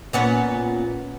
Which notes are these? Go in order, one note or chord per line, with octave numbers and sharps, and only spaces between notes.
A#2 B3 C#4